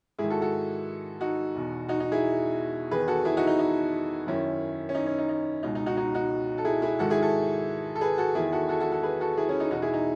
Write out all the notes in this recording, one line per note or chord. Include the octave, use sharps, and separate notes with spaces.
G#2 E4 G#4
D#3
F#4 A4
F#4 A4
D#4 F#4
E2 B2
D#4 F#4
D#4
E4 G#4
E2 D#3 G#4 B4
F#4 A4
E4 G#4
D#4 F#4
D#4
D#4
F#2 D#3 C#4 E4
C#4
D#4
C#4
D#4
D#4
C#2 B2 D#4
D#4
D#4 F#4
D#4 F#4
D#4 F#4
A4
E4 G#4
E4 G#4
G#2 D#3 F#4 A4
E4 G#4
F#4 A4
A4
G#4 B4
F#4 A4
E2 D#3 E4 G#4
F#4 A4
F#4 A4
F#4 A4
F#4 A4
G#4 B4
F#4 A4
E4 G#4
C#4 E4
D#4
E2 B2 D#4 F#4
E4 G#4
D#4